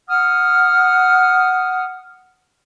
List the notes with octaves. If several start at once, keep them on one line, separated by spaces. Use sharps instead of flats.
F#5 D#6 F6